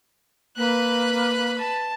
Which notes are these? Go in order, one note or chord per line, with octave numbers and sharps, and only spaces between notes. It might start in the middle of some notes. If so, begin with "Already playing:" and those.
A#3 B4 B5 F#6
A5